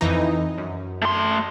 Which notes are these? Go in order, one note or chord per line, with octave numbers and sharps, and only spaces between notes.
F2 E3 D#4
F#2
A3 C6